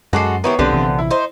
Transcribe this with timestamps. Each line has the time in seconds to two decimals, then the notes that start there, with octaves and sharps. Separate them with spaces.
0.13 F#2 G#3 F#4 A4 F#5 D6 C7
0.44 D#3 B3 E4 G4 C#5
0.59 B1 D3 F3 B3 C4 D4 G4
0.73 A#1 C3 E3
0.99 E4
1.11 D#4 C5